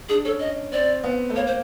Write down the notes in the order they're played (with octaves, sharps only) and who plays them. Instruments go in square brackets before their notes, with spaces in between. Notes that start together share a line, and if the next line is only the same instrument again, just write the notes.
[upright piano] D4 [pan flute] G#4
[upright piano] C#4 [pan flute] A4
[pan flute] D#5
[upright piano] C4 [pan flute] D5
[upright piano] B3
A3
[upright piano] A#3 [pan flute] C#5
[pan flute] C5